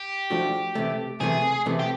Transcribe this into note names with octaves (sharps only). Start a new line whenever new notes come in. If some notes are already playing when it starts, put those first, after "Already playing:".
Already playing: G4
F3 A3 D4 F#4
C3 E3 A3
C3 E3 A3 G#4
C3 E3 A3
G4